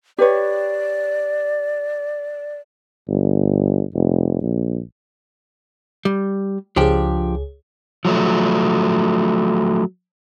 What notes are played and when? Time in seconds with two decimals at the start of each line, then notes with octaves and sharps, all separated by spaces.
0.18 G4 B4 C#5 D5
3.09 G1
3.94 F1
4.42 A#1
6.05 G3
6.76 C#2 F3 D4 G4 G#4
8.05 F3 F#3 A3